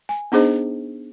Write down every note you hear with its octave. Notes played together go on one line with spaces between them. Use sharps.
G#5
B3 D4 D#4 G#4 C5 D#5